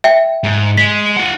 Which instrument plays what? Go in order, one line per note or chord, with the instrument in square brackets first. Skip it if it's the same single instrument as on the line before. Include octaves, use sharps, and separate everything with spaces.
[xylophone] E5 G5
[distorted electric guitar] G#2
[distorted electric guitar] G#3 [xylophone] B6
[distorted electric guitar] F4 F#5